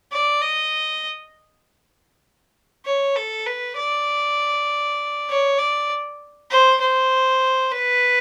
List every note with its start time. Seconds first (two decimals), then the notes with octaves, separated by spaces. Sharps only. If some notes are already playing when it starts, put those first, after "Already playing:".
0.12 D5
0.42 D#5
2.85 C#5
3.16 A4
3.46 B4
3.77 D5
5.29 C#5
5.59 D5
6.50 C5
6.81 C5
7.72 B4